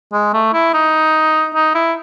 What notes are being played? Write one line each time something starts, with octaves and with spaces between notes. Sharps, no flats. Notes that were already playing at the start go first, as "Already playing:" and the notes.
G#3
A3
E4
D#4
D#4
E4